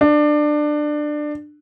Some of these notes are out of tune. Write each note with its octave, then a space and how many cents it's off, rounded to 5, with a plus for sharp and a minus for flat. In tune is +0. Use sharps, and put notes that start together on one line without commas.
D4 +20